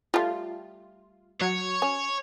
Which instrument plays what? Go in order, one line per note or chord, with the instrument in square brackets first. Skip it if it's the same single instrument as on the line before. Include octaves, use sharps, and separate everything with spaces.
[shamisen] G3 A3 [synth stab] F4
[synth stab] F#3 [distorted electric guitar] C#5
[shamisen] C#4